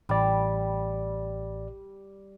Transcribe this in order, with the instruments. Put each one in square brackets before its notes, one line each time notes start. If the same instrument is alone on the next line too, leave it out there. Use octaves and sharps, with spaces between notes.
[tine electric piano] A1 D5 [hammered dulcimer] G3